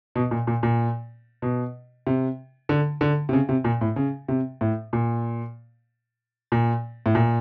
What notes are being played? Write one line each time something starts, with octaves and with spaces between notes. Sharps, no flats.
B2
A#2
A#2
A#2
B2
C3
D3
D3
C3
C#3
C3
A#2
A2
C#3
C3
A2
A#2
A#2
A2
A#2